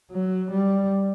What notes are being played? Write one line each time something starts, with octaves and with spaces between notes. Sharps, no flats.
F#3
G3